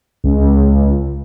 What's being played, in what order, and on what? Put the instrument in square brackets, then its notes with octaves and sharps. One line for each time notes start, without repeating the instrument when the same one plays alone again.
[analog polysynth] C#2